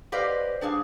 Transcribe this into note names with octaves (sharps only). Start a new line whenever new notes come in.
G4 B4 C5 D5 D#5 F5
G3 D4 G#4 F5